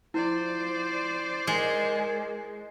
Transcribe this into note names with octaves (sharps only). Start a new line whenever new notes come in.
F3 E4 C5 D5
G#3 A#4